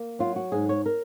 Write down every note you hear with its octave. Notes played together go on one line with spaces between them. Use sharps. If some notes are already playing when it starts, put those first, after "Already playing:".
Already playing: A#3
F#3 F4
F#4
G#2 G#4
C#5
A#4